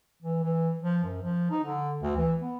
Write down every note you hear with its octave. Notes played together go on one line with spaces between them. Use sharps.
E3
E3
F3
F#2
F3
D#4
D3
D2
E3
B3